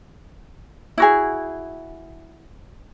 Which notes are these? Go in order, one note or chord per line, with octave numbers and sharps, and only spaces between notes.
E4 F#4 G#4